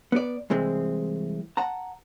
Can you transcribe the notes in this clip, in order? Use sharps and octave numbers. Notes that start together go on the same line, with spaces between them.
B3 D5
C2 E3 G#3 C4
F#5 A5 A#5